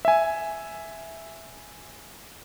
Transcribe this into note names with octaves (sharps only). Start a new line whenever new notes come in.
E5 G#5